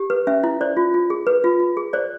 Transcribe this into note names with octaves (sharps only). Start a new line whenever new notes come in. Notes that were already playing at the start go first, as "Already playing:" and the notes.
Already playing: G4
B4
C#4 E5
E4
C5 D5
F4
F4
G#4
B4
F4
F4
G#4
C5 D5